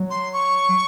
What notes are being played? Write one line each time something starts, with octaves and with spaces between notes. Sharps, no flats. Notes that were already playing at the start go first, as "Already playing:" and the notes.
Already playing: F#3
C6
C#6